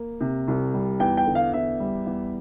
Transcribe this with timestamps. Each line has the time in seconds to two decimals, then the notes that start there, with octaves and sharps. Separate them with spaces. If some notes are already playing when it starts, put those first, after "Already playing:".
Already playing: A#3
0.21 C3
0.48 C2
0.74 G3
1.00 E2 G5
1.17 G5
1.26 D3
1.35 F5
1.53 E2 E5
1.80 G3
2.06 E2